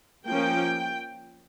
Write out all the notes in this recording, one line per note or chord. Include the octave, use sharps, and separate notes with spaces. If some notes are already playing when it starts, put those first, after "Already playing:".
F3 A#3 C#4 G5